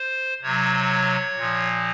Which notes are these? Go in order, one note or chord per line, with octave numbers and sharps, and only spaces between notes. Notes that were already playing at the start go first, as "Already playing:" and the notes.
Already playing: C5
C3 F#3 C#5
A#2 F3